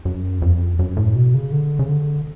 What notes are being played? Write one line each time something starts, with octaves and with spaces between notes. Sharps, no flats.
F#2
F2
F#2
A2
B2
C#3
D3
C#3
D3